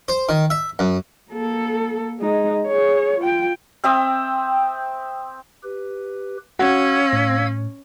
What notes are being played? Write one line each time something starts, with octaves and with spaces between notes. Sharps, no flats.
C5
D#3
E5
F#2
A#3 A4
G#3 D#4
G#4 C#5
F4 G5
C4 E5 G5 D#6
G4 B4
C#4 F#4 F5 F#5 E6 G#6
A2